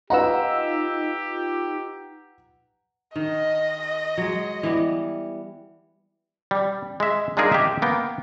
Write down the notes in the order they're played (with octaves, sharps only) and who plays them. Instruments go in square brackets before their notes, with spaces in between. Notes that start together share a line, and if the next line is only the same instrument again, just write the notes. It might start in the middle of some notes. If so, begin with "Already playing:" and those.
[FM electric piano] D#4 F4 E6 [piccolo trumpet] G4 [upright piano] B4 F#5 A#5
[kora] D#3 [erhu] D#5
[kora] F#3 G#3
E3 G3 B3
[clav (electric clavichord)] G3
G#3 E5
G#3 D4 D#4 F4 G#4 A#4
G4 D#5 E5
A#3 B3 G5